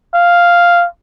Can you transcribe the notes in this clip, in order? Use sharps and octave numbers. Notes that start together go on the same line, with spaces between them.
F5